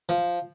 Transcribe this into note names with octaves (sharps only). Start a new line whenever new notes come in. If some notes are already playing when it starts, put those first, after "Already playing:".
F3